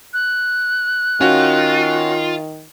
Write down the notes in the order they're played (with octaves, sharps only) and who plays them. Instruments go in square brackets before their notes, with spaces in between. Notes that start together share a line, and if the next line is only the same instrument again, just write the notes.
[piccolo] F#6
[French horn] D#3 [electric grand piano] C#4 F#4 [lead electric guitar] F4